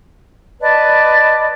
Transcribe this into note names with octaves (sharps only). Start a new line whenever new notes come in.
B4 D5 D#5 A5